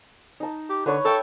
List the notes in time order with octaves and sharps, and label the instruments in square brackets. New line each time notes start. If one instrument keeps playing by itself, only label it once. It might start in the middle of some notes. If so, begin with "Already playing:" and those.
[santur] D#4 A5
[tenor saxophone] G4
[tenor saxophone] D3 [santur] B4 C#5
[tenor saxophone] A4 [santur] C#5 E5 G5